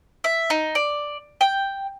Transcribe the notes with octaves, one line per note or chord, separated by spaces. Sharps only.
E5
D#4
D5
G5